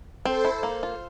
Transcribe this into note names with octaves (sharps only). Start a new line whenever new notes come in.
C4 A4 C5
E4
A#3
F4